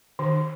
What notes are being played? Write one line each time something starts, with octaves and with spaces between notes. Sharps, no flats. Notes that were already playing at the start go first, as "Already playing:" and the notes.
D#3